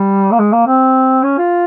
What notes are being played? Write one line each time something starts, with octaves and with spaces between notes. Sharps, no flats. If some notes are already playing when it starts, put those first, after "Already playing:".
Already playing: G3
A#3
G#3
A#3
C4
C#4
F4